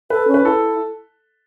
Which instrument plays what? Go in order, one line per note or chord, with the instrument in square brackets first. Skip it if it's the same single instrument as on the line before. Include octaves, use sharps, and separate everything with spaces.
[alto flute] A4 [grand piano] B4
[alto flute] C#4
[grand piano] B4
[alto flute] E4 [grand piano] A4